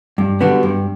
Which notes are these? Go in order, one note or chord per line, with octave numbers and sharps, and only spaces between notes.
G2
D3 G3 B3 F#4
G2